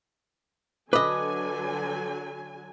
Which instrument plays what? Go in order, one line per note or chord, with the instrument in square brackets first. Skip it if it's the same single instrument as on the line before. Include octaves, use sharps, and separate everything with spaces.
[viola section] D3 F#3 G#5 [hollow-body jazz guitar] B4 D#5 [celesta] D6